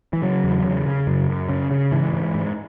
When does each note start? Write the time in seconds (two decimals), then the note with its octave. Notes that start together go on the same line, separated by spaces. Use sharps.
0.13 E3
0.22 C#3 F#3
0.44 E2
0.65 C#3
0.86 C#3
1.07 F#2
1.28 F#2
1.49 C#3
1.71 C#3
1.92 G#2 E3
2.13 G#2
2.35 G#2